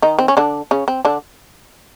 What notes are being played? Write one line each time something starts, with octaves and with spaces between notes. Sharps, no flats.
D#3 D#4
C4
C#4
D3 D4
C#3 C#4
C4
D3 D4